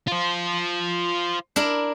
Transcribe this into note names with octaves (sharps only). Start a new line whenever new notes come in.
F4 C5
D4 E4 A#4